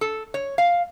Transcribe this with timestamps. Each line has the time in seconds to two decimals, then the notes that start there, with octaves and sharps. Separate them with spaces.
0.01 A4
0.34 C#5
0.58 F5